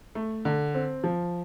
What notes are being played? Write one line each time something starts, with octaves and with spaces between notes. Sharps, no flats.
A3
D3
C4
F3